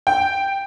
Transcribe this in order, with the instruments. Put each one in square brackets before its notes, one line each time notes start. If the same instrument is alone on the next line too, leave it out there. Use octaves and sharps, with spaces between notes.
[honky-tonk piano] G5